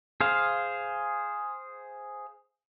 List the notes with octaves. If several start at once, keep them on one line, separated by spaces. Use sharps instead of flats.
G#4 C5 F5